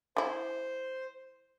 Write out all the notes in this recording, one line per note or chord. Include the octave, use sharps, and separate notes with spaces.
E3 E4 C5